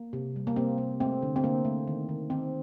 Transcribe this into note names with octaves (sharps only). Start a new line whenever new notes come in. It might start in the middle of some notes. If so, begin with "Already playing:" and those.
Already playing: A#3
C3
G3
A#3
C3 C4
A#3
A3 C4
D3
C4
D3 A#3
A3
D#3
D#3
D#3 C4